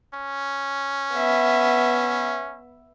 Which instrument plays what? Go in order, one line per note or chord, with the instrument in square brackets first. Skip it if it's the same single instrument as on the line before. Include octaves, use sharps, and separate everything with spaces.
[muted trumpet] C#4
[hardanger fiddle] B3 E5